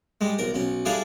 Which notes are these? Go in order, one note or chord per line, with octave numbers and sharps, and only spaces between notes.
G3 G#3
B1 A#4
B1 C#4
G3 D4 E4 G#4 A4 F5